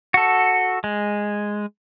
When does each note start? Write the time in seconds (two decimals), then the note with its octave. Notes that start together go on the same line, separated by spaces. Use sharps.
0.14 F#4 A4
0.84 G#3